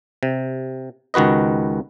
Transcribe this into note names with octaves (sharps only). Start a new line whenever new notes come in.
C3
C#2 D#3 F#4 B4 D#5